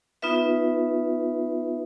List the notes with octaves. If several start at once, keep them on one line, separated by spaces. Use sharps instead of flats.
B3 D#4 F4 B4 E5